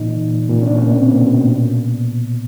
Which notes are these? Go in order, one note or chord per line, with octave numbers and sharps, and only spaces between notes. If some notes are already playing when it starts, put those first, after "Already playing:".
Already playing: A#2 E3 D#4
A#2
A#2
A#2
C#4
B2 D4
C#4
B2 A#3
C4
B2 B3
B2
A#2
A#2